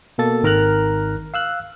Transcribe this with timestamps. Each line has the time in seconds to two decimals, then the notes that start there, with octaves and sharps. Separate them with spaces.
0.18 B2 A#3 A4 A6
0.43 G#1 D#3 A#4 A#5 F6 F#6
1.34 F5 E6 F#6